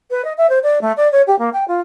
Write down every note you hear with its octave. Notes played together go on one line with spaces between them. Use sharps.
B4
D#5
E5
C5
D5
A3
D5
C#5
G4
A#3
G5
F4